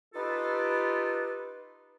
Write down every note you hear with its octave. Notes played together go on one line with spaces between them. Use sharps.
D#4 F4 G4 A4 B4